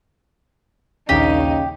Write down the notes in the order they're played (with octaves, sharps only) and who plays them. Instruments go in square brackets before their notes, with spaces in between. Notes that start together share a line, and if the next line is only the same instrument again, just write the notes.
[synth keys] A#1 D#2 D#7 [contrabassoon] C#3 [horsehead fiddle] D#4 [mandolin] G4